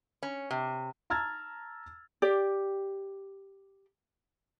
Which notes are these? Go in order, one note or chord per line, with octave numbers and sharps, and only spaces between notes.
C#4
C3
A5 A#5 E6 F6 G#6 A6
G4 D5